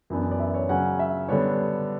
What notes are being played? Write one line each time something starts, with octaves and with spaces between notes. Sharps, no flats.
F#2 E3 B3 D4
D5
E5
C#5
C#3 F#3 C#4 F#5
E5
D3 G3 B3 D4 C#5